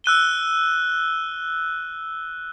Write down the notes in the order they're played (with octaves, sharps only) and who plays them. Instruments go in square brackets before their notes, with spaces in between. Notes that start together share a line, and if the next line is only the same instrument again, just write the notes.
[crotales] E6 F#6 D#7 G7